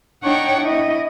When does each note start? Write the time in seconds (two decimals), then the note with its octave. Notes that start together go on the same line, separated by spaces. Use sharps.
0.23 D4 D#4 C#5 F#5 G5 C#6
0.61 E4 D#5